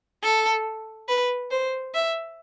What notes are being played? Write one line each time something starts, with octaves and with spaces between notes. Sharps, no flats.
A4
B4
C5
E5